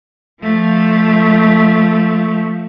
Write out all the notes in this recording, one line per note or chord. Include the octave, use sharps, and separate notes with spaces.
F3 A3